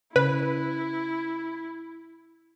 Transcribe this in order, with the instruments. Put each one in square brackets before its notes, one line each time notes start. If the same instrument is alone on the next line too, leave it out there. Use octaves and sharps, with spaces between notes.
[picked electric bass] C#3 [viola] E4 [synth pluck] B4